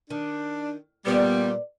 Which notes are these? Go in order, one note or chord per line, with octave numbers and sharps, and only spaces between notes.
D#3 D4
A#2 G3 B3 B4 C#5 D5